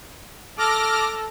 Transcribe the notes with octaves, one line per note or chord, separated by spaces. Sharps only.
A4 D6 F6 A#6